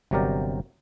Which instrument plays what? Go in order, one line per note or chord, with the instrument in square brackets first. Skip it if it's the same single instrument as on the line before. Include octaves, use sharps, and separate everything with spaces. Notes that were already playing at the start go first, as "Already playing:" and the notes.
[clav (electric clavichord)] G1 C3 F#3 G4 A#4 D5